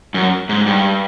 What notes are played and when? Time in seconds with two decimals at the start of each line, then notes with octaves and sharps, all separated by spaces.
0.14 F#2
0.49 G#2
0.66 G2